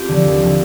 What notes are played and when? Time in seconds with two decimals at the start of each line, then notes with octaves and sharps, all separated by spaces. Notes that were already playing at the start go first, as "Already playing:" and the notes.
Already playing: C4 F4 G4
0.08 D3 F3
0.25 D#2
0.42 D3 F3